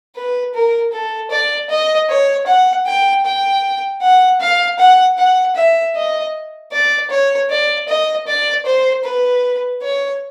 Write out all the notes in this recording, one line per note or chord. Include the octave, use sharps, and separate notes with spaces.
B4
A#4
A4
D5
D#5
C#5
F#5
G5
G5
F#5
F5
F#5
F#5
E5
D#5
D5
C#5
D5
D#5
D5
C5
B4
C#5